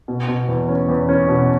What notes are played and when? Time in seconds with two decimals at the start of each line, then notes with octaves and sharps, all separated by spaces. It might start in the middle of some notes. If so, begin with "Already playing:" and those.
0.08 B2
0.28 B2
0.48 E2
0.68 C#4
0.89 E2
1.09 C#4
1.28 B2